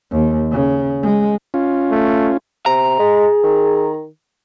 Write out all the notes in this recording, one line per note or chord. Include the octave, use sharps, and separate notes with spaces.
D#2
C#3
G#3
C#4 F4
A3
C3 A#5
G#3 G#4
D#3